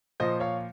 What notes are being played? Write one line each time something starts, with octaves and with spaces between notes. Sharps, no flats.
A#2 F3 C5 D#5
C#5 F5